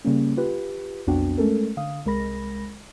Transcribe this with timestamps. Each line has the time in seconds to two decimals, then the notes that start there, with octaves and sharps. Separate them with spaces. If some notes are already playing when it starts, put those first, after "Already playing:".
0.05 C#3 G3 A#3 C#4
0.37 F4 G4 B4
1.07 B1 F2 B3 D4 F#4 G5
1.38 G#3 A3 C#4 A4 A#4
1.77 D3 F5 D#6
2.06 C2 G#3 A#4 B5 A#6